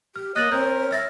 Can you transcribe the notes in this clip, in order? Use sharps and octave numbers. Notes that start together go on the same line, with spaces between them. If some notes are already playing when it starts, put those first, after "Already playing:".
G4 F6
A#3 C#5 D#5 F#6 A6 F#7
C4 A#4 G6
E5 F6 A6 A#6